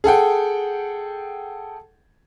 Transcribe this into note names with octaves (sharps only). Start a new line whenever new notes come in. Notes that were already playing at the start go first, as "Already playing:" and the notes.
G#4 A4 F#5 G5